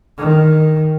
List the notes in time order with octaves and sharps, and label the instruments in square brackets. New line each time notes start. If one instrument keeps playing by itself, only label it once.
[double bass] D#3